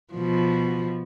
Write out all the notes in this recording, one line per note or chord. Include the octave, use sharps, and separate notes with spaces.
B2 F3